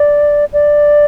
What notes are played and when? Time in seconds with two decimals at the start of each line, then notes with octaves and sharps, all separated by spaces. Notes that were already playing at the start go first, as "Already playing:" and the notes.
Already playing: D5
0.53 D5